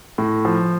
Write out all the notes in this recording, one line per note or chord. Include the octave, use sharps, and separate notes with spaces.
A2
F3